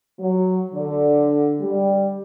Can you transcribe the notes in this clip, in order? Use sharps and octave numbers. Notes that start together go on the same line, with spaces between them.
F#3
D3
G3